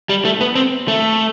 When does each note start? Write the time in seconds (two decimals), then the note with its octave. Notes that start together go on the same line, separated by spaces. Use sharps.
0.09 G3
0.25 A3
0.41 B3
0.55 C4
0.88 A3